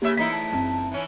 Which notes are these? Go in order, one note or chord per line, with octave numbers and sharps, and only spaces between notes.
G2 C#3 A#3 G4 E5
E2 A3 D#4 E4 B6
A5
F#1 C4
E3 C#4